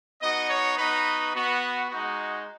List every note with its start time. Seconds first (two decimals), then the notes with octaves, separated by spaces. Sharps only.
0.20 B3 D#4 F#4 D#5
0.50 C#5
0.78 B3 D#4 F#4 B4
1.34 B3 F#4
1.91 G#3 D#4 F#4